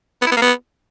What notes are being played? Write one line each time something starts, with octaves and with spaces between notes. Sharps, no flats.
B3
E4
B3
A#3
B3